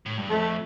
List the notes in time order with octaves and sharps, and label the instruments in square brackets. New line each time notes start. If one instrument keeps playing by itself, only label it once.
[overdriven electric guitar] A2
G2
[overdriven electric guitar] F2 [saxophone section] A3